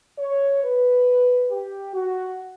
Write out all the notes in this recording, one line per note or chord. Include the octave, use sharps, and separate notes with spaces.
C#5
B4
G4
F#4